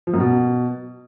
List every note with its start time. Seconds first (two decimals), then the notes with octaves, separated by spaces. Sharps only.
0.07 F3
0.13 F#2
0.20 B2